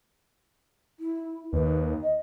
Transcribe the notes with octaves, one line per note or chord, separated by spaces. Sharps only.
E4
D#2 B4
D#5